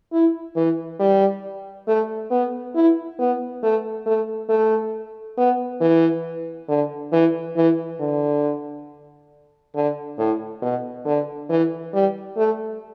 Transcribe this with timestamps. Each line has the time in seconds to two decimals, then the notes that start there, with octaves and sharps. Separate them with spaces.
0.13 E4
0.56 E3
0.99 G3
1.88 A3
2.31 B3
2.75 E4
3.19 B3
3.63 A3
4.06 A3
4.49 A3
5.38 B3
5.81 E3
6.69 D3
7.12 E3
7.56 E3
8.00 D3
9.75 D3
10.18 A2
10.62 B2
11.05 D3
11.49 E3
11.93 G3
12.37 A3